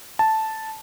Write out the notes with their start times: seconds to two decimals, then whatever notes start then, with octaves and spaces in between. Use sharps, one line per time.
0.19 A5